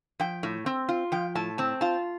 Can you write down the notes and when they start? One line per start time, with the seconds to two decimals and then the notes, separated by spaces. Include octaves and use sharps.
0.20 F3 G5
0.43 A2
0.66 C4
0.89 F4
1.12 F3 G5
1.35 A2 A5
1.58 C4 A5
1.81 F4 A5